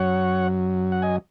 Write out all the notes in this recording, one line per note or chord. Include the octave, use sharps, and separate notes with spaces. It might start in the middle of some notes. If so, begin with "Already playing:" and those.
Already playing: F#2 F#3 C#5 F#5
F#5
D#5 G#5